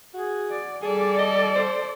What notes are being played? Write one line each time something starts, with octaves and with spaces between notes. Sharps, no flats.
F#4 G#4
D5
G3 G#4 A4 D5
D#5
C5